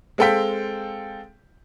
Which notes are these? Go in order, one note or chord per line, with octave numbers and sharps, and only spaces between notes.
G#3 C4 A4 F5 G5 B6